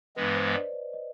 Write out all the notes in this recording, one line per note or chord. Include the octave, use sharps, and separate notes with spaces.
G2 E3 G#3 B3 B4
C5
D#5
D5
D#5
D#5